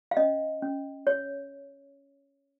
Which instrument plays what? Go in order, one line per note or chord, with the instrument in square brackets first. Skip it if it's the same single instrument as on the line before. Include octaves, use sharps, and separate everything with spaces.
[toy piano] F5
C#4 D#5
C#4
C#5